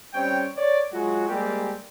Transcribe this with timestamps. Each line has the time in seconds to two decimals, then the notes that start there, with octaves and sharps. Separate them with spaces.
0.14 G3 C4 C#4 C#5 G5
0.56 C#5 D5
0.92 F#3 G#3 F4 F#4
1.28 G3 G#3 A#3 C4 G4